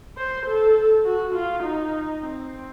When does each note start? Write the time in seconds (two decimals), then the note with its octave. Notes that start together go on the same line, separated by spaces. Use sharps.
0.17 C5
0.46 A4
1.05 F#4
1.35 F4
1.63 D#4
2.22 C4